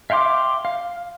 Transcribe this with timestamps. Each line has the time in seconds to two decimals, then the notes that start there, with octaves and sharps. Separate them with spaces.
0.10 E5 F5 G5 C6 D6
0.65 F5